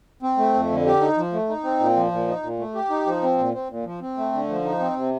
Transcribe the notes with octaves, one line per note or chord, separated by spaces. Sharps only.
C4
A3
F2
D3
G4
D#4
F3
A3
D#4
C4
A#2
F3
A#2
D#4
A#2
A3
G4
D#4
F3
C4
A#2
C4
A#2
F3
C4
A3
D3
F3
D#4
C4
C3